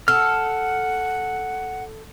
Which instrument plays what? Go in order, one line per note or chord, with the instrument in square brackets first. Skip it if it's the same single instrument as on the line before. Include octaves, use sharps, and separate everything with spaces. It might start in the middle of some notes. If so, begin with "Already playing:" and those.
[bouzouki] A4 [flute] F#5 [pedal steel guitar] F6